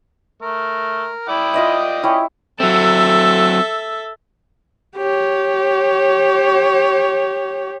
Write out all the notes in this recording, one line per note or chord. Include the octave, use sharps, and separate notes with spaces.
A3 A#4
E4 D5 G5 D#6
F4 D#5 E5
C#4 E4 G4 C#5
F#3 C4 A4 E5
G4 C#5